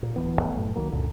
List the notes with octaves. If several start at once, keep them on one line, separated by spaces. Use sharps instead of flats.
A#2
D1 G#1 E3 B3
D#1 F#2 A3 B3
F#1 F#2 A2 A3
C2 D#3 F#3 A#3
C#2 F#2 A#2 D3